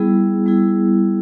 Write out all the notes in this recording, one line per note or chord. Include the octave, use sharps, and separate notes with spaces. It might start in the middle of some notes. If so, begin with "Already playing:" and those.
Already playing: G3 B3 E4 G#4
G3 B3 E4 G#4